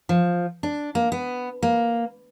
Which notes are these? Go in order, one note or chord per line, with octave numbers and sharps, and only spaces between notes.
F3
D4
A#3
B3
A#3